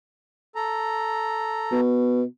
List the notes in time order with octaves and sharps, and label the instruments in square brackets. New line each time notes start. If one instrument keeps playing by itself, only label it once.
[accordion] A4 A#5
[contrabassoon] B2